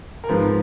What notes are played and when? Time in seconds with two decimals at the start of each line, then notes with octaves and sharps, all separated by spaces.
0.24 A#4
0.29 G#2 F3 B4